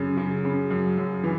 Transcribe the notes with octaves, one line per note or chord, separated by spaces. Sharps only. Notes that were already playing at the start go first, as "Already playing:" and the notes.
Already playing: F#2 C#3
C#3
C#3
F#2
F#2
E3